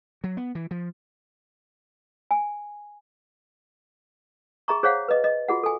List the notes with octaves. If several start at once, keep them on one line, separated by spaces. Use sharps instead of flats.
F#3
B3
E3
F3
G#5
G#4 E5 A#5 C#6
G#4 C5 C#5 F5 F#5
B4 D#5
D#5
F4 F#4 G#4 F#5
A4 G#5